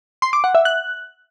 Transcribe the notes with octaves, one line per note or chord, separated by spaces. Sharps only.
C6
D6
F#5
E5
F#6